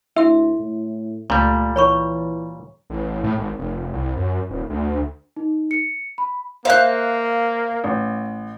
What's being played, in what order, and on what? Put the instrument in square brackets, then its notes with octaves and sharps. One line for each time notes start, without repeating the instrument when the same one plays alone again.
[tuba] D2 [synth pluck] E4 C6 [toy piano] E5
[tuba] A2
[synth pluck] C#2 [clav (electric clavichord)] A#2 G3 [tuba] A3
[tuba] E3 [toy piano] C#5 B5 C#6
[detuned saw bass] A1
A2
G#1
F1
C2
F#2
D#1
D2
[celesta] D#4
C#7
B5
[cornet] A#3 [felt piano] C5 E5 G6 [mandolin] F5 F#6
[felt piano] A1